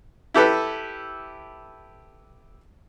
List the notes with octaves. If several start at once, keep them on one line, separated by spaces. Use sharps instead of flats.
E4 G4 A4 B4